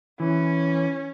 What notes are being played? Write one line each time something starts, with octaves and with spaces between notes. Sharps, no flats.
E3 C#4